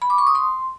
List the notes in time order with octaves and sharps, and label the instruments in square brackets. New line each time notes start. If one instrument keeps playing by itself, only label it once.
[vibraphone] B5
D6
C#6
D#6
C6